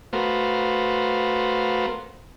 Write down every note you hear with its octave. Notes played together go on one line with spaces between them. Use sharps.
A3 B3 F#4 A#4 C5 F5